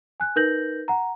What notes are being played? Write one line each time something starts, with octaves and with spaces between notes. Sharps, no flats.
G#5 F#6
D#4 A#4 B4 G6 A#6 F#7
F#5 A#5